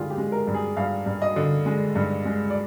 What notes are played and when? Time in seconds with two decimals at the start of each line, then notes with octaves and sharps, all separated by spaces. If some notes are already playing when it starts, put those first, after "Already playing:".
Already playing: G2 D3 G#3 F4 G4 G#4
0.10 G4
0.18 G#3
0.32 A#4
0.47 G2
0.54 G#4
0.77 G2 F5
1.06 G2
1.22 D#5
1.36 D3
1.66 G#3
1.96 G2
2.25 G#3
2.50 D5